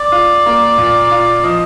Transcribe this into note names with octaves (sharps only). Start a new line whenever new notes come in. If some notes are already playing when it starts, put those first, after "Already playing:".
Already playing: D5
F4
A#3
A#2
F4
F3 D#5